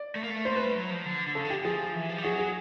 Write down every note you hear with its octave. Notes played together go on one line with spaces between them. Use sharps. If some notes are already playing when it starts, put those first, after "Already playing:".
Already playing: D5
A3
A#3
A3
A#3 C5
A3 B4
G3
F#3
F3
D3
D3
C#3 A4
D3
G4
F3 G#4
E3
F3
G3
F#3 G#4
G#4